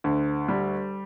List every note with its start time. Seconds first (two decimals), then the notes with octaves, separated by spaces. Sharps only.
0.04 D2
0.48 G3